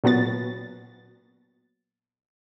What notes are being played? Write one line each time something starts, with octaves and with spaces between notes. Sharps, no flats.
A#2 F#3 B3 A6